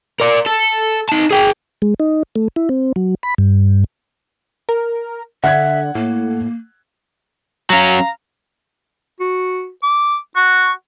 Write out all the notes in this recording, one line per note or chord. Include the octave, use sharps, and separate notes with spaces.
A#4 D5
A4
D#4 A5
G#4 G5
G#3
D#4
A3
E4
C4
F#3
B5
G2
A#4
D3 E5 F#5 F#6 G#6
A2 A#3
F#3 C#4 F5 A#5
F#4
D6
F#4 C#6